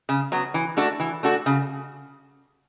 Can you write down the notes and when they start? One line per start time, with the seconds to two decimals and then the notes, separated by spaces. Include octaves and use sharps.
0.09 C#3
0.32 F#3 B3
0.54 E3
0.77 A3 D4 F#4 A4
1.00 E3
1.23 A3 D4 F#4 A4
1.46 C#3